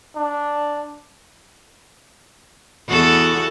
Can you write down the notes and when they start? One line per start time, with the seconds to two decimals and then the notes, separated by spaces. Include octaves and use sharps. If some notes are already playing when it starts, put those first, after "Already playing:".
0.16 D4
2.89 E2 F#4 A4